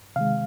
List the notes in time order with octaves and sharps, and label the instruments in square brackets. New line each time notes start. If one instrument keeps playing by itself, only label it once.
[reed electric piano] C3 D#3 G#3 F5